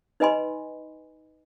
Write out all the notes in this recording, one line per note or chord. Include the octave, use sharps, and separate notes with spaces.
D#4 B4 D#5 G#5 B5 C6